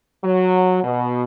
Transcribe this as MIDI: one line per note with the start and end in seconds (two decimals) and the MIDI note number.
0.24 0.81 54
0.84 1.24 47